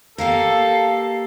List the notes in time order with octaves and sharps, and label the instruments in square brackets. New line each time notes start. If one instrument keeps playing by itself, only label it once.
[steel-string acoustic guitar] A#3 G4 A#4 [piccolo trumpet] A4 [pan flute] F5